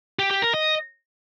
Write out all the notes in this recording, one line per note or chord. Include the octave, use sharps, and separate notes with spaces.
G4
G4
A#4
D#5